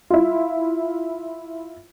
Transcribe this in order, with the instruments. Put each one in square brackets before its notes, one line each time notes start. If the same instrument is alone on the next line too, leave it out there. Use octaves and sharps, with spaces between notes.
[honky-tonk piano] E4 F4